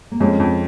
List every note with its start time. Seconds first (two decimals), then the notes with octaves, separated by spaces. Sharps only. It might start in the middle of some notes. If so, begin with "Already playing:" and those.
0.12 A#3
0.20 F2 G#3 C#4
0.40 F2